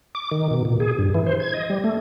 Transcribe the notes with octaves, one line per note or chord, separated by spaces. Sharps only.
D6
D#3
B2
A#2
G#4
G2
E3
C5
G#6
D#5
G3
A3